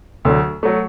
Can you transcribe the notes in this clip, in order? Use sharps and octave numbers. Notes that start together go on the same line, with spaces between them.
D2 D3 F#3 A3
F#3 A3